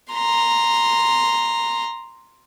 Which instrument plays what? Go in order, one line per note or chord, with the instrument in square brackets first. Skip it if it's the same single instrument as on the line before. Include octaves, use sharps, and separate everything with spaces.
[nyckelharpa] A#5 C6